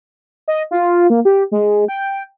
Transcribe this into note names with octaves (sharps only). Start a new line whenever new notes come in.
D#5
F4
A#3
G4
G#3
G5